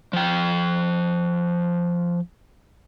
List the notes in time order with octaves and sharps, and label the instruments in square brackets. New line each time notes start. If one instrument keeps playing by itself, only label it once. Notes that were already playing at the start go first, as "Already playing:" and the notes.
[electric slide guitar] F3 G5